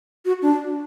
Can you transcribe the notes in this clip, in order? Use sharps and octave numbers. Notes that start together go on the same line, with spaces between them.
F#4
D4